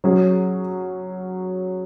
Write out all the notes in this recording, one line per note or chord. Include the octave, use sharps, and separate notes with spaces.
F#3 C#4 G#4